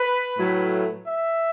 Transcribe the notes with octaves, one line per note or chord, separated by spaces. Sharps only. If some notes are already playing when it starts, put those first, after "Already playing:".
Already playing: B4
A2 F#3 A3
E5